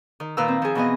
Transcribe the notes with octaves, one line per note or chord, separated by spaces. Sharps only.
D#3
A#2 D#3 B4 F5 A#5 E6
C4
F3 G#4
B2 E3 B3 D#5